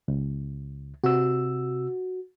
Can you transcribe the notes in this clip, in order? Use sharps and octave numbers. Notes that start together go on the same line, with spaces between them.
C#2
C3 F#4 E6